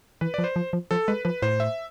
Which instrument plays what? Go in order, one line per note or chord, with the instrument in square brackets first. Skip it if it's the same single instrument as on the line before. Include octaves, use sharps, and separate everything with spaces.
[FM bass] E3 [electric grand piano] B4
[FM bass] F3 [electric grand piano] D5
[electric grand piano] C5
[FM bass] F3
F3
[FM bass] F3 [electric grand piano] A4
[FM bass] G#3 [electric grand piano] B4
[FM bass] F3 [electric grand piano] B4
[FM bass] A2 [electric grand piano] C5
[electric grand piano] E5